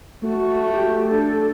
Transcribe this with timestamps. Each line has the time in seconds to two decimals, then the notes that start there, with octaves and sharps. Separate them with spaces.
0.23 A3 F#4
0.71 F#4 G4
1.05 D4 A4